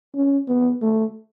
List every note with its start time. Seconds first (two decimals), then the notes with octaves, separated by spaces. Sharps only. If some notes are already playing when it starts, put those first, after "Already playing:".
0.15 C#4
0.48 B3
0.82 A3